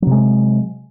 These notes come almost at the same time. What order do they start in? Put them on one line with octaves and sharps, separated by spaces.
F#3 C3 G#3